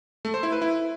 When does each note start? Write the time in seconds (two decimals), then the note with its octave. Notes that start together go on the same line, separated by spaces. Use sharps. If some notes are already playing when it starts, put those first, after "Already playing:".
0.25 A3
0.34 C5
0.43 E4
0.52 B4
0.62 E4